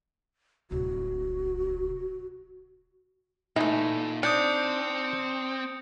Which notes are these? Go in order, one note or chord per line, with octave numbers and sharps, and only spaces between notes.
D1 C2 F#4
A#2 E3 A3 D#4
C4 D4 D#6 G6 C#7